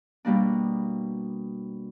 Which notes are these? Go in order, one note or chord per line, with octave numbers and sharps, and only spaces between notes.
B2 G3 A#3 D4